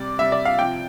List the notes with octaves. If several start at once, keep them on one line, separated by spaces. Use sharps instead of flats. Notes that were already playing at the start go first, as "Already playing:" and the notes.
Already playing: C3 G3 D5
C3 G3 E5
D5
F5
C3 F3 G5